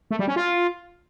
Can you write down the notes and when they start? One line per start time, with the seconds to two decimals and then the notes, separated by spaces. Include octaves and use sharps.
0.11 A3
0.19 G3
0.28 C#4
0.36 F4